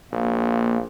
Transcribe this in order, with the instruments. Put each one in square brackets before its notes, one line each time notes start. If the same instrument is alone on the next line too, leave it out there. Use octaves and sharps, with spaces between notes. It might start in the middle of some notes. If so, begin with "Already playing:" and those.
[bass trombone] A#1 [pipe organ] A#3